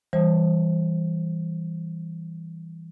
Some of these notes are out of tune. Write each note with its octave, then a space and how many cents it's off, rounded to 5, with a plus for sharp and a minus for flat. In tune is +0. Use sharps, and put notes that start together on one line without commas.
E3 +0 G3 +0 C5 +20